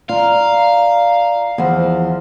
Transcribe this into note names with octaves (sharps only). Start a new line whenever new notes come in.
F4 D5 F5 A#5
E2 F3